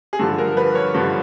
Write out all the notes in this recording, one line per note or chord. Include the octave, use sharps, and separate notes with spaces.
G#4
G2 D3 F3 A4
A#4
B4
C#5
G2 D3 F3